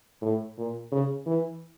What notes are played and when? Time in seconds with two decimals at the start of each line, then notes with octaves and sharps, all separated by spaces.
0.22 A2
0.57 A#2
0.92 C#3
1.26 E3